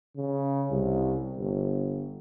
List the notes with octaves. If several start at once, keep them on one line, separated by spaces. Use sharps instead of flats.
C#3
C2
G1